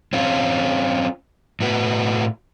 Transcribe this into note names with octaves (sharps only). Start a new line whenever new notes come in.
C4 C#4 F4
A2 F#4 B4